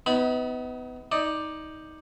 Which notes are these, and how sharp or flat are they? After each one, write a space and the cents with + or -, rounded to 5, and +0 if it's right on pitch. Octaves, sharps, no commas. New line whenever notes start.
B3 +25 D#4 +40 B5 -20
D#4 +15 D5 +15